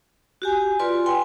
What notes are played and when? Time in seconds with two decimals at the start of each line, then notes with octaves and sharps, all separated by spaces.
0.42 F#4 G4 G#5
0.80 F4 B4 D5 C6
1.06 G5 G#5 C6